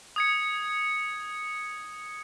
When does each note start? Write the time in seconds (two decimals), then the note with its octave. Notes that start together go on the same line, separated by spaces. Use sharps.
0.16 D#6 G#6 C#7